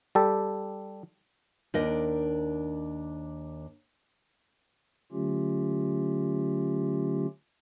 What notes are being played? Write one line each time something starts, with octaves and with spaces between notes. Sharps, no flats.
G3 G4 A4
D#2 D4 A#4 D#5
D3 F#3 A3 C#4 F4 G4